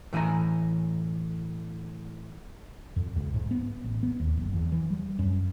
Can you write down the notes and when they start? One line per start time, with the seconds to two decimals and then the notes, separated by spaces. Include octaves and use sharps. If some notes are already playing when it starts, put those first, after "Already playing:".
0.13 A2 E3 D#5 G#5 A#5
2.96 F2
3.16 C#2
3.34 G#2
3.51 B3
3.84 A1
4.03 B3
4.20 D#2
4.37 F#1
4.53 E2
4.72 E3
4.90 G3
5.19 F#2